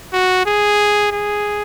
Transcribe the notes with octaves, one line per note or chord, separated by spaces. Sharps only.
F#4
G#4
G#4